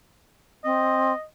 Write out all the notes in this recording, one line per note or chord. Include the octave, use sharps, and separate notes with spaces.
C4 D#5